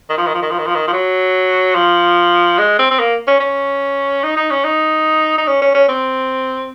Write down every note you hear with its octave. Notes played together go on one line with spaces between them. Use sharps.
D#3
F3
D#3
F3
D#3
F3
D#3
F3
D#3
F3
F#3
F3
G#3
C4
C4
A#3
C#4
C#4
D#4
D#4
C#4
D#4
D#4
C#4
C#4
C#4
C4